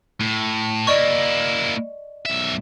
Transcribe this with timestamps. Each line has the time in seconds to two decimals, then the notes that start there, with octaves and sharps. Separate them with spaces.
0.21 A2
0.87 A#3 E4 D5 D#5 C#6
2.25 B1 E5